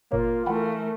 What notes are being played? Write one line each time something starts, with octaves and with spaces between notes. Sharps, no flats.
G1 A#2 A#3 F4 C#5
E3 A3 A#4 F#5 G5 B5